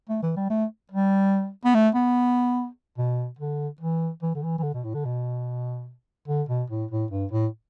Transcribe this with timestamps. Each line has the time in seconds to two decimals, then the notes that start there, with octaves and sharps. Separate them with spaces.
0.09 A3
0.23 E3
0.37 G3
0.50 A3
0.92 G3
1.65 B3
1.74 A3
1.95 B3
2.98 B2
3.39 D3
3.81 E3
4.22 E3
4.35 D3
4.43 E3
4.59 E3
4.63 D3
4.74 B2
4.84 A2
4.94 D3
5.05 B2
6.28 D3
6.49 B2
6.70 A2
6.91 A2
7.11 G2
7.32 A2